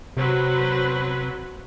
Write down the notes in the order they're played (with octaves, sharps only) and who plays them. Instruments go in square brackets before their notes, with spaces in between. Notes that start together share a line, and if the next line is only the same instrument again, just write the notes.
[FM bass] C3 [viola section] F#3 C4 B4